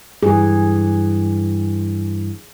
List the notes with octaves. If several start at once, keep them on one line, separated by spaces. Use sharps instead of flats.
G2 E3 G#4